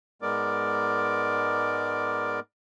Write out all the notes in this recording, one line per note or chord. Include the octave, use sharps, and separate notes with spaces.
G#2 G#3 B3 A#4 D5 D6